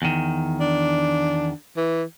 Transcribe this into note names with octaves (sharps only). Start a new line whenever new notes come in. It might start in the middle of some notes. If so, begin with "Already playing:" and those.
E2 D#3
D4
E3